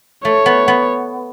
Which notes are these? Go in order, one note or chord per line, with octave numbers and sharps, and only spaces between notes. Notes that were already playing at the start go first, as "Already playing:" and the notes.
A3 C#5
B3
B3